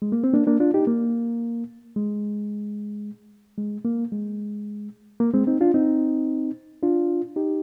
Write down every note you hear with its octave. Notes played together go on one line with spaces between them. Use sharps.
G#3
A#3
C4
A#3 D4
A#3 D4
D4 F4
D#4 G4
A#3
G#3
G#3
A#3
G#3
A#3
G#3 C4
C4 D#4
D4 F4
C4 D#4
D4 F4
D#4 G4